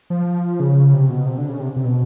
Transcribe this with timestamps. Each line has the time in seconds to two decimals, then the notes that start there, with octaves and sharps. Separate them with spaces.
0.10 F3
0.60 C#3
0.94 C3
1.10 B2
1.26 C3
1.38 D3
1.49 C#3
1.60 C3
1.76 C3
1.85 B2